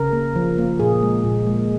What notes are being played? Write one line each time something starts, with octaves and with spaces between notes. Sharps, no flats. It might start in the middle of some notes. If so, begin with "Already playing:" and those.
Already playing: C#3 A#4
A#3
F3
A#3
A#2 G#4
G#3
A#2
G#3